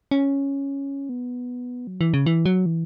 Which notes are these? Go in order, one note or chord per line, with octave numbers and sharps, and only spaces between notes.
C#4
B3
F#3
E3
C#3
E3
F#3
E3